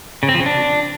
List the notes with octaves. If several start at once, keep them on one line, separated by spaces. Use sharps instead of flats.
C#3
C4
F3
C#3
D4